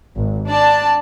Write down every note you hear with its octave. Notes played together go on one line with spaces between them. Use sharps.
G#1
D4 D5 A5